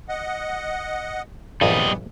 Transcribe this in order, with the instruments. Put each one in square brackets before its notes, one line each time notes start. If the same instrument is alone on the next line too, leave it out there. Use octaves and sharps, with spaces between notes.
[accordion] D#5 F#5
[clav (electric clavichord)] A#1 G2 [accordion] E3 B3 [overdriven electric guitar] G3 D#5